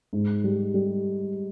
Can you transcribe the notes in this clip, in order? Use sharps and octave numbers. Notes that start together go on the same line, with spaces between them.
G#2
G3
G3